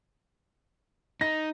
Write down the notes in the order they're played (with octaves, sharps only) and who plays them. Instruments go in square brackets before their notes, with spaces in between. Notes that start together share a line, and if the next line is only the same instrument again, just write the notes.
[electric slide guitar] D#4 [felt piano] A#6